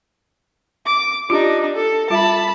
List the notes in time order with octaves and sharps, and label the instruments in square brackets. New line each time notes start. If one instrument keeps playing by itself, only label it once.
[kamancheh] D6
[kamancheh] D4 D#4 [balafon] F4 G4
[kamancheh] A4
[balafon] G3 F4 E5 [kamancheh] A5 B5